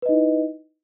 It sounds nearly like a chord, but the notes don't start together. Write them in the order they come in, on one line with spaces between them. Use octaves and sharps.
B4 D#5 D#4 E4